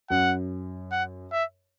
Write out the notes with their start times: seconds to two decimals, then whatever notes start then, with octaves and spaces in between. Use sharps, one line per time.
0.10 F#2 F#5
0.91 F#5
1.32 E5